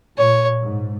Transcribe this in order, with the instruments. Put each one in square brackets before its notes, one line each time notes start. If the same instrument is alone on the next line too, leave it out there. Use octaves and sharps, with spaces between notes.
[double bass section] A#2 [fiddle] C#5
[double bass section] G#2